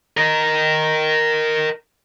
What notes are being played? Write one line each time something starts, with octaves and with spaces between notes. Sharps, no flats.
A#4 D#5